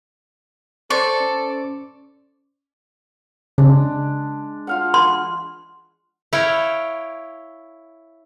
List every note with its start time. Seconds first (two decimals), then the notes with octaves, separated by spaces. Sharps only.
0.90 A4 C5 D5 C#6
1.20 C#4
3.58 C#3 G#3 D4
4.67 F4 F5 F#5
4.94 C6
6.33 E4 C#5 E5 F5 G5